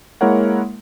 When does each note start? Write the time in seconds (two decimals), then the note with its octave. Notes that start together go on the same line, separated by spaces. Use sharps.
0.21 G#3 A#3 E4 A#4 C#5 F#5